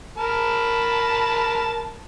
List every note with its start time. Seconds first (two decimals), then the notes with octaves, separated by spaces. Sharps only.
0.17 A#4 A5 B5